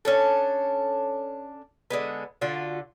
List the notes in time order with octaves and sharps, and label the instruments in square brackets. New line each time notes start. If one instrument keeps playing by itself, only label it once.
[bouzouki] C#4 D4 A4
D3 G#3 B3
D3 F4 F#4